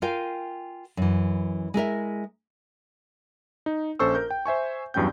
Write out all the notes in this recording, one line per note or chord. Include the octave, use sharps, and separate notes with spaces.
F4 A#4 F5 G5 G#5
F#2 E3
G#3 E4 A#4 E5
D#4
A#1 C#4 A4 C5 C#6 E6
A#4 G6
G5
C5 E5 G#5 C#6
E2 G2 F#3 C#4 G5 G6